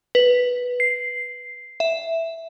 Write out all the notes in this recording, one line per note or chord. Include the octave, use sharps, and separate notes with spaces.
B4
C7
E5